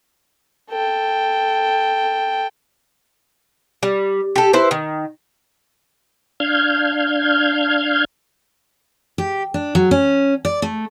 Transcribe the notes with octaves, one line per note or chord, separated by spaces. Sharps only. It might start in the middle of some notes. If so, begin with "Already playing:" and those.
A4 G5
G3
G4 A4
E4 B4 C5
D#3
D4 F5 F6 G6 G#6
G4
D4
F#3
C#4
D5
A3